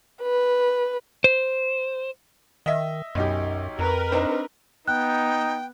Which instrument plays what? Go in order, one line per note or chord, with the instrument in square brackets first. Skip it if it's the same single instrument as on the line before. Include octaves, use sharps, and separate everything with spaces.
[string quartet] B4
[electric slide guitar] C5
[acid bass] D#3 [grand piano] D#5 E5
[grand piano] B1 D#4 G4 [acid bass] F#2
[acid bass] F2 [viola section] A#4 B4
[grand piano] C4 D4 D#4
[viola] B3 [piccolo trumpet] D#4 [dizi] G5 [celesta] F#6